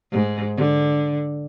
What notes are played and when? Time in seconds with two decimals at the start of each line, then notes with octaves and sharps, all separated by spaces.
0.12 G#2
0.57 D3